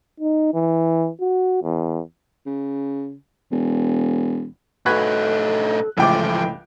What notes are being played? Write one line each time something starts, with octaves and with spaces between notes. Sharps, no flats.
D#4
E3
F#4
E2
C#3
E1
A2 D#4 F#4 A4 B4 G#5 F#6
C#2 A2 E3 F3 A3 G5 D6